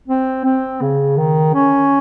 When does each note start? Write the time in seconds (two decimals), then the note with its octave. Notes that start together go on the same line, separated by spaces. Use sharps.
0.08 C4
0.45 C4
0.81 C#3
1.17 D#3
1.54 C#4